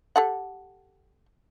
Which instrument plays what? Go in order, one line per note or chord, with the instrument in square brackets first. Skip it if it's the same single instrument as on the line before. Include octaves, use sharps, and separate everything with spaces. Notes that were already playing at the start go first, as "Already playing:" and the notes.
[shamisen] G4 A4 F#5